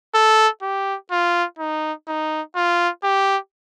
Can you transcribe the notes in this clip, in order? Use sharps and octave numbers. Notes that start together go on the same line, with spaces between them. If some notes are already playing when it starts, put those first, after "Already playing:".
A4
G4
F4
D#4
D#4
F4
G4